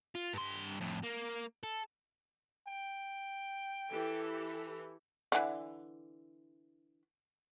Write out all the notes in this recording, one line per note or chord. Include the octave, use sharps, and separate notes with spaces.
F4
G2 C6
F2 A2
A#3
A4
G5
E3 G4 A4
D3 E3